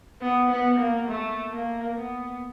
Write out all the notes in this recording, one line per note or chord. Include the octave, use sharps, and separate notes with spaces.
B3
B3
A#3
A3
A#3
B3